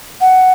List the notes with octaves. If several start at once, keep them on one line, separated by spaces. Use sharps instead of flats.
F#5